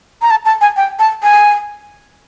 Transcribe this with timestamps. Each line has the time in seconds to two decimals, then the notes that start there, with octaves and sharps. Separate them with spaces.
0.22 A#5
0.31 A5
0.45 A5
0.61 G#5
0.77 G5
0.99 A5
1.23 G#5